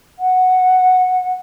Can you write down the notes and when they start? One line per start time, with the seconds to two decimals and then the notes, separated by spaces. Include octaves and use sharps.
0.18 F#5